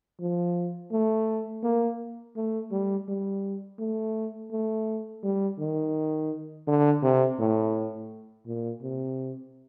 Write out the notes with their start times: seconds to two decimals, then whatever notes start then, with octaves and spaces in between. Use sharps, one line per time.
0.20 F3
0.92 A3
1.63 A#3
2.36 A3
2.72 G3
3.08 G3
3.79 A3
4.52 A3
5.23 G3
5.59 D#3
6.67 D3
7.03 C3
7.39 A2
8.47 A#2
8.82 C3